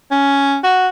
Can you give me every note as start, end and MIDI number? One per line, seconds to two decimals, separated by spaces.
0.11 0.57 61
0.64 0.87 66